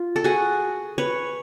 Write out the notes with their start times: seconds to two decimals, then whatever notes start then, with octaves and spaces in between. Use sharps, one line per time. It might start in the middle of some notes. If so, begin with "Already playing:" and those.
Already playing: F4
0.16 A4
0.24 F#4 G#4
0.98 B4 C#5